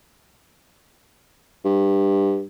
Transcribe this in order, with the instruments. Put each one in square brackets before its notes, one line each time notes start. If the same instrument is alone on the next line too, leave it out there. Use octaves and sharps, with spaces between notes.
[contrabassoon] G2